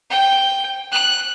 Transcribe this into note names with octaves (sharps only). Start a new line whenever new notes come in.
G5
F#6